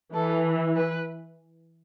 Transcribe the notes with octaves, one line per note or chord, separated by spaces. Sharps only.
E3 A4
B4